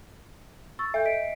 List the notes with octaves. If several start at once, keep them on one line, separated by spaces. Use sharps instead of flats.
C#6 E6 A6
A4 E5 G6
D#5 B6 D7